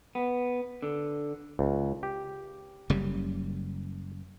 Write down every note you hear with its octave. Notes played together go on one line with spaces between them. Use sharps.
B3
D3
C#2
G4
F#1 C#3 G3